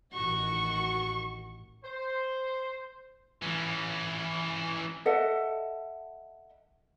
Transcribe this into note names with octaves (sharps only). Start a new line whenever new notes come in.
A1 D#3 F#4 C#6
C5
E3 C#4
A4 D#5 E5 F#5